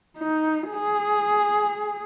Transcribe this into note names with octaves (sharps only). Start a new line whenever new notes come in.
D#4
G#4